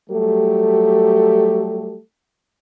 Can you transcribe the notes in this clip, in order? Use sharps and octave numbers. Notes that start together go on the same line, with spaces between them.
F#3 G3 A3 G4 A4